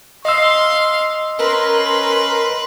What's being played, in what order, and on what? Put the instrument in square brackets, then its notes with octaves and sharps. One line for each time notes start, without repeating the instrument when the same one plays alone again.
[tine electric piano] D#5 E6 [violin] F5 [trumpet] C6
[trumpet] C#4 [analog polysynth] A#4 C6 [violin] B4